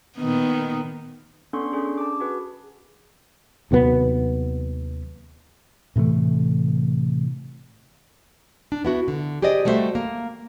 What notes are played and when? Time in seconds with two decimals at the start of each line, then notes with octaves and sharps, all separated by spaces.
0.18 A#2 D#3 B3
1.53 B3 C#4 D4 A4 C6 C#6
1.72 C#4 D4 G#4 A4
1.85 G#4
1.98 A5 D6
2.20 F#4 G#4 B4
3.71 D#2 C3 F#3 B3
5.96 A2 C3 E3 A3
8.72 D4
8.85 B3 E4 F#4
9.08 D3
9.42 G4 G#4 C5 D5 D#5
9.65 G3 A3 F#4 A4 C5 E5
9.95 A#3